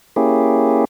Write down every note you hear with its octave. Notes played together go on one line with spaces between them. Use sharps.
A#3 C#4 E4 G4 G#4